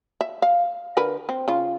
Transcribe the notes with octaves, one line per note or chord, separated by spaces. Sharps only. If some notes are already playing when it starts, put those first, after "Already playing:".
E5
F5
D3 A#4 B4
C4
C#3 F4